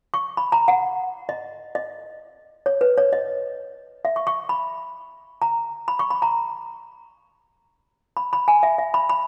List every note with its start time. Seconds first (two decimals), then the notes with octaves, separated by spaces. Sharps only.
0.14 C#6
0.37 B5
0.52 A#5
0.68 F#5
1.29 D#5
1.75 D#5
2.66 C#5
2.81 B4
2.97 C#5
3.13 D#5
4.05 E5
4.16 C#6
4.27 C#6
4.49 B5
5.42 A#5
5.88 B5
5.99 C#6
6.10 B5
6.22 A#5
8.17 B5
8.33 B5
8.48 G#5
8.63 E5
8.78 E5
8.94 B5
9.09 B5